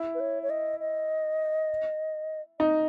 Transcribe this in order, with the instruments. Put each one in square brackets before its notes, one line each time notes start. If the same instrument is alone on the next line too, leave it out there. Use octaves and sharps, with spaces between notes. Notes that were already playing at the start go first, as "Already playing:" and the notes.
Already playing: [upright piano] E4
[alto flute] B4
C#5
C#5
D#5
D#5
[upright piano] D#4 [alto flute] D#5